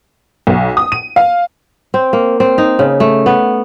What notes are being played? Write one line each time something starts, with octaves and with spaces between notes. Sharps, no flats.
B1
D#6
D#7
F5
C4
A#3
C4
D#4
C#3
A3
B3